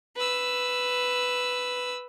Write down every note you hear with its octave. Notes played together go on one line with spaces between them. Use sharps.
B4 E6